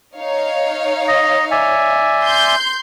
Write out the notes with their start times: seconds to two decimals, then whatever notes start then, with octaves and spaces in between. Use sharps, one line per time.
0.17 D#4 C#5 F5
1.08 D#5
1.51 D5 E5 G#5
2.23 C6 G6